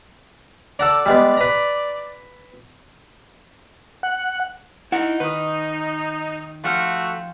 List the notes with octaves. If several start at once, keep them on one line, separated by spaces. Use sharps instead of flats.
A4 D5 F#5 A#5
G3 G#3 B3
B4 A#5
F#5
D#4 E4 F#5
D#3 B4 D#6
F3 A3 F#4 G5 F6